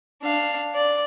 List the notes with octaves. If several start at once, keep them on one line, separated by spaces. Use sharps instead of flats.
D4 F5
D5